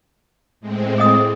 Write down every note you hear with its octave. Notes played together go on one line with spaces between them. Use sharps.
A2 G#3 C4
G#4 D#5 D#6